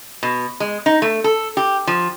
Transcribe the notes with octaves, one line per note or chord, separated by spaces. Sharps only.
B2
G#3
D#4
A3
A4
G4
F3